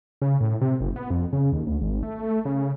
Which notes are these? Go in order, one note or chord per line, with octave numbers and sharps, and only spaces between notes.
C#3
A2
C3
F#1
B3
F2
C#3
D#2
D2
G#1
A3
C#3